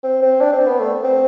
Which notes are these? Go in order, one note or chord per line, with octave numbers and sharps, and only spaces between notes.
C4
C4
D4
C4
B3
A3
C4